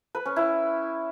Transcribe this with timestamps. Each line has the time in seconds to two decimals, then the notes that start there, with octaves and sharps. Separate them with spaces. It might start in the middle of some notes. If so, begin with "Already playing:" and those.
0.15 B4
0.26 C#4
0.36 E4